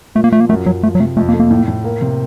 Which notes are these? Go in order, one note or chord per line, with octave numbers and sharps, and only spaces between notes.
A#2 A3
A#3
F3 A3
A#3
F#2 A3
F#2 F#3
F3 A3
F#3
C3 A3
F2 A3
A#3
A3
A#3
A2
A2
A#3
C3